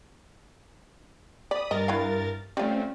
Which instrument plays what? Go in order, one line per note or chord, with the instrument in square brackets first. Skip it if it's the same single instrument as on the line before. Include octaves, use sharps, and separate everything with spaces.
[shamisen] D5 [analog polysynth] B5 D#6
[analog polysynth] G2 A#4 A6 [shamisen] D#5
[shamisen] E4 B4 F5
[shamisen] G3 F4 [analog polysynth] A3 C4 C#4